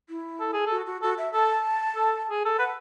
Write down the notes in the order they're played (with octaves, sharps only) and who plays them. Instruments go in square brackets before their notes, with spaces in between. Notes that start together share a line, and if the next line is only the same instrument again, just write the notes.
[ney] E4
[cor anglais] A4
G#4
[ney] F#4 [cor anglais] A4
[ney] F#4
[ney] F#4 [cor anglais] A4
[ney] E5
[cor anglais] A4 [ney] A5
[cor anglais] A4
G#4
A4
[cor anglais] B4 [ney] F#5